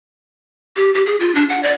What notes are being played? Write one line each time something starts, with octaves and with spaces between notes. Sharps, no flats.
G4
G4
G#4
F4
D4
F#5
D5